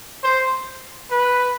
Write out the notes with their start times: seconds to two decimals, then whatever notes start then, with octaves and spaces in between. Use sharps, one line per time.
0.23 C5
1.11 B4